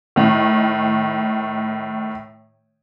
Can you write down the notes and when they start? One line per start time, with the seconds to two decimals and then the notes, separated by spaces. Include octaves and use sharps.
0.16 A2 D#3